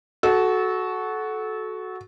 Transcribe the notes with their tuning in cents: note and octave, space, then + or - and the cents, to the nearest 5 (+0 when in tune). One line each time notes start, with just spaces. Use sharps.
F#4 +0 A4 -25